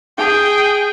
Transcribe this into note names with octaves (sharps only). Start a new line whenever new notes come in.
G#4 G5